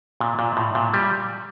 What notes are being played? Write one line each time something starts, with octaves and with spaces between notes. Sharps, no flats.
A#2
A#2
A2
A#2
G3